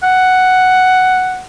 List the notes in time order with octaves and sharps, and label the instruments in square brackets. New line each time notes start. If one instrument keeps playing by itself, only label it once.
[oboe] F#5